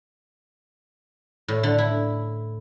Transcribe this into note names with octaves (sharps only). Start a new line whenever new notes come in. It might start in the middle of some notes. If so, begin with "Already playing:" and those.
A2
D3
E4